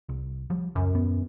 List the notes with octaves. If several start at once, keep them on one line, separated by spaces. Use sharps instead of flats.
C2
F3 G3
C#2 F#2
D#1 B3